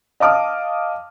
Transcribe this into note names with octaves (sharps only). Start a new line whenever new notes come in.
D#5 F5 A5 D6 D#6 F6